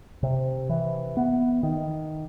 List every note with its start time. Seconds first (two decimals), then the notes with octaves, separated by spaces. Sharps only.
0.23 C3
0.69 E3
1.17 B3
1.63 D#3